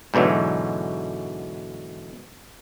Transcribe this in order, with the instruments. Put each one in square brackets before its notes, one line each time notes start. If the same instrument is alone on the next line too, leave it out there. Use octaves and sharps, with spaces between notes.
[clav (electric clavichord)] G#2 B2 D3 E3 F#3